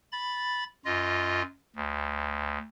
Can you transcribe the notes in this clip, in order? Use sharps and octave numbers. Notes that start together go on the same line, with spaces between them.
B5 A6
F#2 F4 D#5
D2